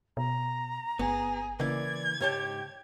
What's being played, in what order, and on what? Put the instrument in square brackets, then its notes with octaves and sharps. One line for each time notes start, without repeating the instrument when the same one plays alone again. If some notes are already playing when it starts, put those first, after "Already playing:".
[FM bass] B2 [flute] A#5
[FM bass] G1 [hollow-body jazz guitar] B3 [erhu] G#4
[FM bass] C#3 [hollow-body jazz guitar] E3 A#3 [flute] D5 [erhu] G#6
[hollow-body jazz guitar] G#2 C#5 A5 [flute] G4